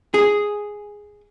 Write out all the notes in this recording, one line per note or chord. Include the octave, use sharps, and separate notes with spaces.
G#4